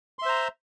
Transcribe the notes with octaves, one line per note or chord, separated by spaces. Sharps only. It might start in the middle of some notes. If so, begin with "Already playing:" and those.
C5 E5 A#5 C6